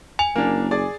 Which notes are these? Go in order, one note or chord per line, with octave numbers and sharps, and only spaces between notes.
G#5 F7
F#1 A#3 D4
G#4 D5